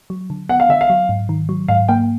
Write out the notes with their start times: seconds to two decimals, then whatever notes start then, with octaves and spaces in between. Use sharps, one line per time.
0.10 F#3
0.30 D3
0.49 B3 F#5
0.60 F5
0.69 D3 E5
0.81 F5
0.90 F#3
1.09 G#2
1.29 D#3
1.49 F#3
1.68 G#2 F5
1.89 A#3 G5